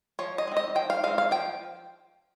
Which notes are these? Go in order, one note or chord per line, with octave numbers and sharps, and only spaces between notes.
F3 C#5
D#5
G#3 C4
D#5
F3 G5
F5
G#3 C4 F5
F5
F3 G5